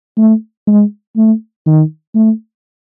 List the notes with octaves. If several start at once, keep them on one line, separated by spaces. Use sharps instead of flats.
A3
G#3
A3
D#3
A3